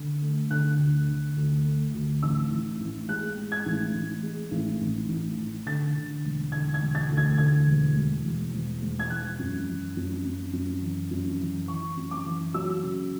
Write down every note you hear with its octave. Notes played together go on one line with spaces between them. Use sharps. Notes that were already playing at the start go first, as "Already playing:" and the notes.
Already playing: D3
A3
D3 F#6
D2
D3
D2
A3
D2
A1 E6
A1
A1
G#3 F#6
G#3
G#6
A1
A1
G#3
A1
A1
A1
A1
D3 A6
D3
E1
D3 G#6
G#6
E1
A6
D2
G#6
D2 G#6
E1
E1
E1
E1
E1
G#6
E3 F#6
F#2
E3
F#2
F#2
F#2
E3
F#2
E3
E3 C#6
F#2
D6
E3
F#3 E6
C#3